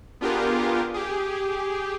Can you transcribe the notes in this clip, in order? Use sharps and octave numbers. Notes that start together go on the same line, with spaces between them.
B3 D4 F4 G4 G#4 A#4
G4 G#4